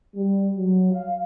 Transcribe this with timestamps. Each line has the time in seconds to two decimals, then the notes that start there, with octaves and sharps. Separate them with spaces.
0.16 G3
0.58 F#3
0.93 F5